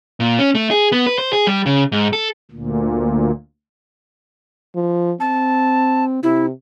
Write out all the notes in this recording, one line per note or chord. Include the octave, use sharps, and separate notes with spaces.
A#2
C#4
A3
G#4
B3
B4
C5
G#4
G3
C#3
G#2
A4
D2 A#2
F3
C4 A5
C3 E4